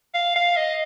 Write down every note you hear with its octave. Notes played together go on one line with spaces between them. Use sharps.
F5
F5
D#5